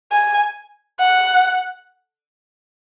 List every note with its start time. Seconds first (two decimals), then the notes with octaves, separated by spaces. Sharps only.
0.12 G#5
1.00 F#5